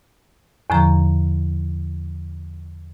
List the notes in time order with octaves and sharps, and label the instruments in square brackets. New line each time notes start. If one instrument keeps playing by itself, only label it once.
[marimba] E2 A2 D3 F3 A#5